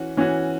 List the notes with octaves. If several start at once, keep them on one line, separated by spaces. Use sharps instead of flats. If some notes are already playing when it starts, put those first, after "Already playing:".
Already playing: E3 C#4 F#4
E3 C#4 F#4